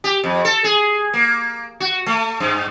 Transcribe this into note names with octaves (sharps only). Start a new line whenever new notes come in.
G4
F2
A4
G#4
A#3
F#4
A3
G2